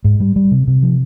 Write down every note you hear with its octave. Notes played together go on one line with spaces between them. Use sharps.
G#2
G3
G3
C3
C3
F3